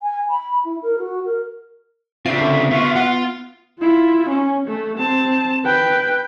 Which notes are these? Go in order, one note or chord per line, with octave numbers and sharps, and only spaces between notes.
G#5
B5
E4
A#4
F#4
A#4
C#3 C4 D4 F4 E5 C7
D3
B3 F4 F#4
F4 F#5
E4 F4
C#4
A3
C4 A5
B4 G5